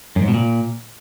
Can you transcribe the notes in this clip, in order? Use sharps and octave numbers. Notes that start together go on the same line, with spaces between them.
F#2
G#2
B2
A#2